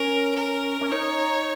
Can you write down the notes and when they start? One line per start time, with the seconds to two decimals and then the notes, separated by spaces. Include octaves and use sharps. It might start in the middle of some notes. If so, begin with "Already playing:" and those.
Already playing: C#4 A#4
0.36 A#4
0.81 C#4
0.92 D#4 C#5